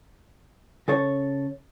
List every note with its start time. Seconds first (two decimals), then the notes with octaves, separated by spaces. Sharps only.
0.88 C#3 A4 C#5